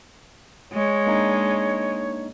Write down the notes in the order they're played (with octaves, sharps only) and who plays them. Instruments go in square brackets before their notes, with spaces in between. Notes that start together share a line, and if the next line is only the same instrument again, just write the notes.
[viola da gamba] G#3 [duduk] C#5
[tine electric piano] A#3 D4 D#4